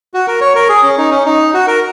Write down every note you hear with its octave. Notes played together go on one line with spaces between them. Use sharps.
F#4
A#4
C#5
A#4
G#4
C#4
D#4
C#4
D#4
F#4
A#4